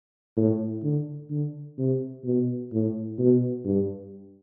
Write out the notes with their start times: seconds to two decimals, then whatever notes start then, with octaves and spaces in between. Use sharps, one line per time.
0.37 A2
0.83 D3
1.30 D3
1.78 C3
2.25 B2
2.72 A2
3.19 B2
3.65 G2